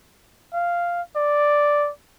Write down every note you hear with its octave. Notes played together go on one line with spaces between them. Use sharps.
F5
D5